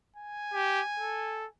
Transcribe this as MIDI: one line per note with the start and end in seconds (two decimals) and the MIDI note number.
0.16 1.51 80
0.54 0.81 67
1.00 1.47 69